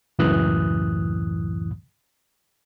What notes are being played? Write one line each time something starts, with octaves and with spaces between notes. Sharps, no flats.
C#2 F#2 A2 E3 D#6 F#6